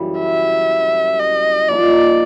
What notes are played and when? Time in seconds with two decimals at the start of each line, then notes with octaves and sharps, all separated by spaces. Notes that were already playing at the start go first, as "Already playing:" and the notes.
Already playing: F#2 C#3 E3 G3
0.19 E5
1.20 D#5
1.69 F3 A#3 D#4 D5